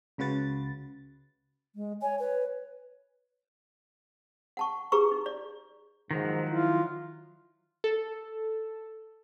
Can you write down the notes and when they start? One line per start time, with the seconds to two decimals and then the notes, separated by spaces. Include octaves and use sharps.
0.18 C#2 C#3 F#4 B4 A6
1.75 G#3
2.02 C#5 G#5
2.20 B4 C#5
4.57 F#5 A5 C#6
4.92 E4 G4 G#4 B4 A#5 C#6
5.12 D#4
5.26 D5
6.11 G#2 D#3 F3 F#3
6.50 E4 F4
7.84 A4